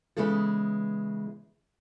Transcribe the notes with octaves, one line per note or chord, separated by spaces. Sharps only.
C#3 E3 G#3 B3 G#4 A4